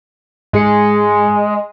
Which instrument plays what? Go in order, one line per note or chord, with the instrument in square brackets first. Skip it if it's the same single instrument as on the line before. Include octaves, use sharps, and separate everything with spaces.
[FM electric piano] G#2 G#4 C#7 [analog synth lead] G#3